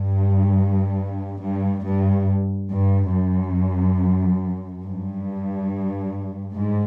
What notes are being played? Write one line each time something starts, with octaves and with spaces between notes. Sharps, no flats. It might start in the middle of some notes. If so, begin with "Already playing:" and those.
Already playing: G2
G2
G2
G2
F#2
G2
G#2